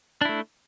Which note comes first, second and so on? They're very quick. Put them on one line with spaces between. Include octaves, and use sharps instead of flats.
D4 E4 A3